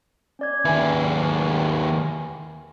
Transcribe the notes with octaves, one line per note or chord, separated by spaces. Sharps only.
C#4 D5 G#6
D#2 B4 E5 G#5